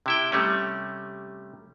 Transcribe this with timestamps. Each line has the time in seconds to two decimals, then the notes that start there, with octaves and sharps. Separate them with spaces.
0.06 C3 E4 G5
0.32 C3 G3 A3 C#4